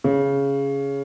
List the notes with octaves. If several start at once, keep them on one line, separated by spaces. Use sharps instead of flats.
C#3